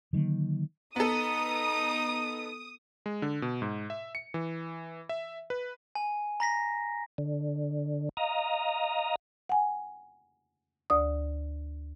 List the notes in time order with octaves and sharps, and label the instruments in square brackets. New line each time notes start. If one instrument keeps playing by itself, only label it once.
[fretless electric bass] D3 D#3 F#3 A#3
[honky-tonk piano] B3 A4 [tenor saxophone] D#4 [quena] A#5 [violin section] D#6
[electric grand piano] G#3
D3
B2
G#2
E5
C#7
E3
E5
B4
[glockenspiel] G#5
A#5 A#6 B6
[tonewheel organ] D3
D#5 F5 A#5
[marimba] F#5 G#5
D2 D5 D#6